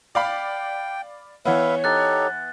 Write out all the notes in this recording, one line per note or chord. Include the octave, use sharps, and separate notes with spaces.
D5 F5 G5 B5
E3 B3 B4 C#5 E5 F5
D#4 G4 A4 F#6 A6